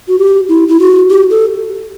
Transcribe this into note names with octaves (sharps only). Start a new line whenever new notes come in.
F#4
G4
E4
E4
F#4
G4
A4